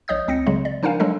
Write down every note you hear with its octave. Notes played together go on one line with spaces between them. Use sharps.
A#1 C#5 D#5 D#6 G6
C#2 C4 A#6 C#7
C#3 F#3 G#3
D5
F3 D4 D#4 A#4 F5 G#5
F#3 G#3 D4 A4 D#5